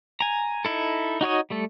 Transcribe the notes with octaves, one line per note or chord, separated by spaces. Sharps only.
G#5 A#5
D#4 E4 A4
D#4 F#4 C#5 D#5
G3 A3 A4